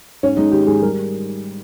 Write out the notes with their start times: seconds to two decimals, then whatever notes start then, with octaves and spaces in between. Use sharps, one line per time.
0.23 G#2 C#4
0.37 G#3 D#4
0.52 D#3 G4
0.67 G#2 G#4
0.82 G3 A#4